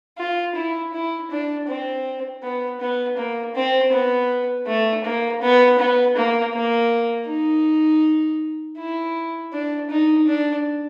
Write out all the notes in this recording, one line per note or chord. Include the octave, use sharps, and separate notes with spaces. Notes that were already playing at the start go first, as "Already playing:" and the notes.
F4
E4
E4
D4
C4
B3
B3
A#3
C4
B3
A3
A#3
B3
B3
A#3
A#3
D#4
E4
D4
D#4
D4